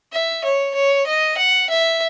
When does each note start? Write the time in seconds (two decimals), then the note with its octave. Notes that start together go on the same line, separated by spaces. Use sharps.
0.13 E5
0.44 C#5
0.75 C#5
1.07 D#5
1.37 F#5
1.70 E5